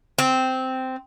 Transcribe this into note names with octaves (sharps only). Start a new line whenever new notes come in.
C4